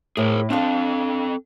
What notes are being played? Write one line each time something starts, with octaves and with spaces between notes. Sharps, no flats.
A2 G#4 A#4
C4 D4 A4 F5